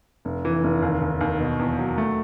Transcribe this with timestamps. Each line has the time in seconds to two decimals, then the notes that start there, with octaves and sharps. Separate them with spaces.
0.25 F1
0.45 E3
0.64 F1
0.82 D#2
1.02 D#2
1.21 D#2
1.40 B2
1.59 E2
1.79 F#3
1.98 A3